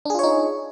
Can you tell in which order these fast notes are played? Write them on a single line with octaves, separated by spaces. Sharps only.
D4 G#4 F4 C#5 D#4